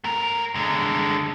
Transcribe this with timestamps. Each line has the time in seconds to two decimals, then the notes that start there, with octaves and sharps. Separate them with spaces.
0.04 A3 A#4
0.55 D3 G#3